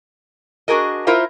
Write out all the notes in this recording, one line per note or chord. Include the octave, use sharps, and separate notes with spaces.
D4 F#4 G#4 A#4 D#5
E4 F4 A#4 C5 E5